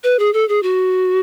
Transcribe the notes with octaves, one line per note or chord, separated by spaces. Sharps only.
B4
G#4
A4
G#4
F#4